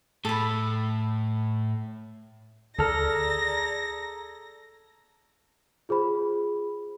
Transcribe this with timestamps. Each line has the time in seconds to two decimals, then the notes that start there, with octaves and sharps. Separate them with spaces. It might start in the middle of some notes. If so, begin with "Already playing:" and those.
0.25 A2 A4 B5
2.79 D2 G#4 A4 D5 A#5 F6 A#6
5.89 F4 G#4 C5 B5